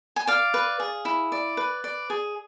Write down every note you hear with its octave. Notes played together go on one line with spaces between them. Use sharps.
G#5
D5 F5
B4
G#4
E4
D5
B4
D5
G#4